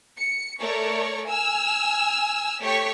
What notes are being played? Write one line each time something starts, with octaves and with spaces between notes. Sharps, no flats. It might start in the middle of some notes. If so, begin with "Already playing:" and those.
C#7
A3 A#4 C#5 D5 C#6
G#5 E6 F6
A3 G4 A4 C#5 C#6 B6